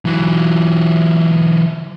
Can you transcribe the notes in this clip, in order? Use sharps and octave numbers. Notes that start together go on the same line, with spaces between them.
E3 F#3